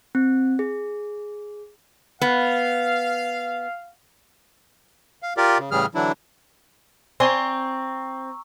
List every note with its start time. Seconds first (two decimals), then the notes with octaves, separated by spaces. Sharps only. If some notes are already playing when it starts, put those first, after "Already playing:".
0.15 C4
0.59 G#4
2.21 B3 F5
5.23 F5
5.37 F4 G4 A#4 D5
5.59 C#3
5.71 A2 C#3 E3 G3 G#4 F6
5.95 D3 E3 F#3 D4 E4
7.20 C4 D5 G#5 A#5 C6 C#6 E6